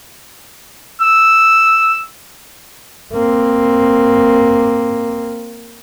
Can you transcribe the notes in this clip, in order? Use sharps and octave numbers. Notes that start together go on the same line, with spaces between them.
E6
A#3 C4